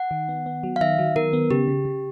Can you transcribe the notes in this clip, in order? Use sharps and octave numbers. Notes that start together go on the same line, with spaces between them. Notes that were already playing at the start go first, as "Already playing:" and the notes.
Already playing: F#5
D#3
B3
B3
F#3
F5
D#3 E5
F#3
D#3 A#4
B3
C#3 G4
C#3
C#3